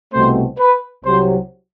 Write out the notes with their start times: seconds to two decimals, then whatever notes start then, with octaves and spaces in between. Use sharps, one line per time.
0.12 C2 B2 A3 C4 C5
0.58 B4
1.04 C2 C3 F#3 C5